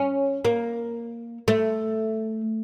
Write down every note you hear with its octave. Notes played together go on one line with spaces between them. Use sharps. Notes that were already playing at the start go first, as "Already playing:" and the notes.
Already playing: C#4
A#3
A3